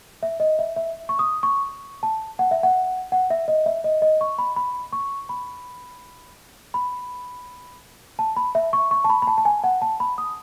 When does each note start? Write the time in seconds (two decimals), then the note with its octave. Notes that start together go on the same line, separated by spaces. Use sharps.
0.23 E5
0.40 D#5
0.59 E5
0.76 E5
1.09 C#6
1.19 D#6
1.43 C#6
2.03 A5
2.39 F#5
2.51 E5
2.63 F#5
3.12 F#5
3.30 E5
3.48 D#5
3.66 E5
3.84 D#5
4.02 D#5
4.21 C#6
4.38 B5
4.56 B5
4.93 C#6
5.29 B5
6.74 B5
8.19 A5
8.37 B5
8.55 E5
8.73 C#6
8.91 C#6
9.05 A5
9.10 B5
9.22 B5
9.27 A5
9.38 A5
9.45 G#5
9.64 F#5
9.82 A5
10.00 B5
10.18 D#6